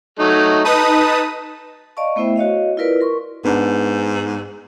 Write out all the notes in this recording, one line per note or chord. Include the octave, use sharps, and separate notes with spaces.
F#3 A3 D#4
D#4 B4 A5 D#6
D5 D#5 F5 A5 C#6
A3 B3 E4 C5 E5 G5
F#4 C#5 D#5 F5
E4 F4 A#4 B4 D5
A#4 C6 C#6
G#2 B3 D4